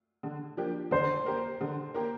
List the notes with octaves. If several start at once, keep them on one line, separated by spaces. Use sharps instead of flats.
D3
F3 A#3 D4 G4
D3 C5
A#3 G4 A#4
D3
A#3 G4 A#4